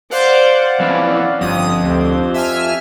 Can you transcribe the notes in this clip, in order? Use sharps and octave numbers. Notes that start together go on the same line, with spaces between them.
C5 D5 F5 F#5
F2 E3 C#4
G1 F2 D#6
D2 C4 G4
E5 G#5 F6